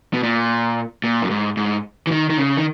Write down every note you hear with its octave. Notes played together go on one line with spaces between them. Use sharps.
B2
A#2
A#2
F#2
G#2
G#2
E3
D#3
D#3
C#3
D#3